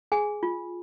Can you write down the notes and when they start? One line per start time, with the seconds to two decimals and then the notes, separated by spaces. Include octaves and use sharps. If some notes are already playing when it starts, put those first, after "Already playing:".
0.12 G#4 G#5
0.43 F4